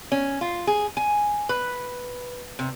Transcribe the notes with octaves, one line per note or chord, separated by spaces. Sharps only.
C#4
F4
G#4
G#5
B4
C3